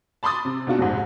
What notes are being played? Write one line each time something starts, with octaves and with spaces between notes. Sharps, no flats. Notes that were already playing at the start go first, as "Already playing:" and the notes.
A5 B5 C6 D6 D#6 A6
C3
B2 D4 F4 F#4
F1 A#1 G#2